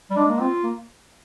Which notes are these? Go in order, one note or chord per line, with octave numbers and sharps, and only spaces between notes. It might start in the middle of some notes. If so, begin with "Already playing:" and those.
G3
G#3 D4
A#3
C4 F4
A#3